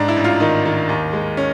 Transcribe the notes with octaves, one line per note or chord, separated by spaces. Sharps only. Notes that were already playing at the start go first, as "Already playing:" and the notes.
Already playing: G#2 D4
E4
A1
F4
D#3 D#4
D#3
D#2
G#3
C#4